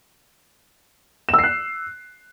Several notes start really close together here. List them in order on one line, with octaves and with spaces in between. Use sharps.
E7 E6 C7 F#6